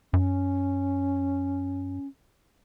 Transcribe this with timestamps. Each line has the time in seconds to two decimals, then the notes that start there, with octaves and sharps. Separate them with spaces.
0.13 F#2 C#4